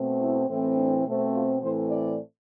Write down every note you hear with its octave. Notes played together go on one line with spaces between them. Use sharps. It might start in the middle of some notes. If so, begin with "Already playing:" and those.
Already playing: B2 A3 C4
E4
A2 E3 A3 C4
D4
B2 A3 C4
F4
A2 E3 A3 C4 C5
D5